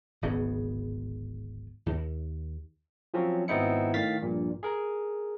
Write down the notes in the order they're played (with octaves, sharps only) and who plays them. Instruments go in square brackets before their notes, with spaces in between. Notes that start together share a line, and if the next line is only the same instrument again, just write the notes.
[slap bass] D1 G#1 C#3 B3
D#2
[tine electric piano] F3 F#3 C4 C#4
G#1 B3 C4 D#4 E4 C#7
A2 D#3 F5 A6 B6
A#1 G2 A#2
G#4 A#4